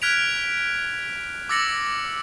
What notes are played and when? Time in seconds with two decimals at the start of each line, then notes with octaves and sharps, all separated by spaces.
0.02 F6 F#6 G#6 B6 D7 F7
1.49 D6 E6 A6 A#6 C#7 F#7